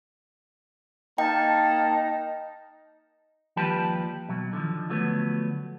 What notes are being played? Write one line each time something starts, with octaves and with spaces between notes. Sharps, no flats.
A#3 D#4 G5 A5
D#2 F3 G3 G4 B4 A5
B2 F#3
D3 D#3 F3
D3 F3 F#3 A3 B3